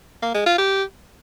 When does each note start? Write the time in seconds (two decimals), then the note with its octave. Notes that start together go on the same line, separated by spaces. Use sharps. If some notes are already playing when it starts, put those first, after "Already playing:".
0.22 A#3
0.34 G#3
0.46 F4
0.58 G4